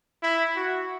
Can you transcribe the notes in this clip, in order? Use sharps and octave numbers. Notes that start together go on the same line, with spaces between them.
E4
F#4